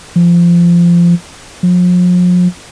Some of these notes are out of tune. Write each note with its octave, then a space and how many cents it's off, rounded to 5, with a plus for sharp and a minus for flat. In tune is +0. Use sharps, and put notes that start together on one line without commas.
F3 -20
F3 +40